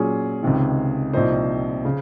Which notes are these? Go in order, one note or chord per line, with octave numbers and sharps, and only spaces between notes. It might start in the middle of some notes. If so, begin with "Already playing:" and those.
Already playing: A#2 F#3 C#4 G#4
C#2 C3 D#3
C2 A#2 F3 C4 D#4 C5
C#3